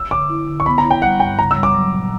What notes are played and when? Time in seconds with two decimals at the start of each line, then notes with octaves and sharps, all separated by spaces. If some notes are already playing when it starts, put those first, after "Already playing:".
Already playing: E6
0.11 D3 D6
0.29 E4
0.48 D3
0.60 C#6
0.66 B3 B5
0.78 A#5
0.84 E4
0.91 G5
1.02 G3 F#5
1.20 G2 G5
1.39 C#3 A#5
1.51 E6
1.57 G3
1.63 D6
1.75 F#3
1.93 A#2